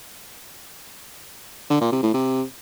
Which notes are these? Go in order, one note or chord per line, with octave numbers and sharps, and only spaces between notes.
D3
A#2
C3
A2
C3